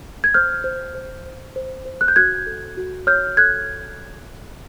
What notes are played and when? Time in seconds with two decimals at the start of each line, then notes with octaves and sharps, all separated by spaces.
0.24 G#6
0.34 C5 F6 G6
0.64 C5
0.95 C5
1.26 C5
1.56 C5
1.85 C5
2.01 F#6
2.08 G6
2.16 F#4 F#6 G#6
2.47 A4
2.77 F#4
3.07 C#5 F6 G6
3.37 A4 F#6 G#6